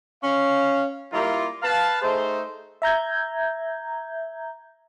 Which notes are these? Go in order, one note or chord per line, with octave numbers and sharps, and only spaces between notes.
C#4 F5
G3 A#3 E4 F4 A#4
B4 F5 A5
A3 D#4 G#4 C5
E5 A#5 G6 G#6